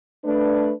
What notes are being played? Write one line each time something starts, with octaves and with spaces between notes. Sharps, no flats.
A3 D4 B4